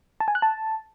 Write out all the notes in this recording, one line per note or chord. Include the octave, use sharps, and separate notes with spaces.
A5
G#5
F#6
A5